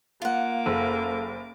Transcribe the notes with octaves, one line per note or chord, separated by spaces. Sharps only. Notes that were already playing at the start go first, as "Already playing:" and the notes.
A#3 F4 F#5 D6
F#1 A4